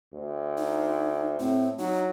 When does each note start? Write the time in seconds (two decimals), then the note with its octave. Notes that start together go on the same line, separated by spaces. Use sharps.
0.14 D2
0.58 D#4
1.40 A2 C4
1.79 F#3 D#4